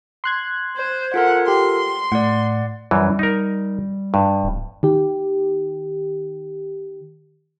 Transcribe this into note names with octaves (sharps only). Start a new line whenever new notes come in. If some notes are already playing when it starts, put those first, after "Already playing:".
C6 F#6 G#6
C5
F4 A4 A#4 F#5
G4 C6
A2 D5 F#5
F#2 E3 G3
D#4 A#4
G2
D1
D#3 G4